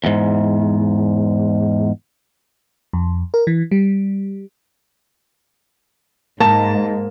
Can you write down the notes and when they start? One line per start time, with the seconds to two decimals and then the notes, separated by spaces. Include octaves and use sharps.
0.04 E2 G#2
2.93 F2
3.34 A#4
3.47 E3
3.71 G3
6.40 G#2 A#3 A5